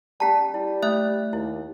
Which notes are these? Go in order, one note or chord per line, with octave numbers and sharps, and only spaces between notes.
G3 C#4 G4 A5 A#5 B6
G3 E4
A3 E5 F#6
D#2 E4